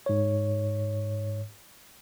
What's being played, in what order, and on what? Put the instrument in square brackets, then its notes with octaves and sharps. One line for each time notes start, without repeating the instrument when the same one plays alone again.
[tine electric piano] G#2 C#5